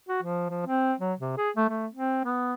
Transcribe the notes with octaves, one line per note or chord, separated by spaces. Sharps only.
F#4
F3
F3
C4
F#3
C3
G#4
A3
A3
C4
B3